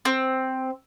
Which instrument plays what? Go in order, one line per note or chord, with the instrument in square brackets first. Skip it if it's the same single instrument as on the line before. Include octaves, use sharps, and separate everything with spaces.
[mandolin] C4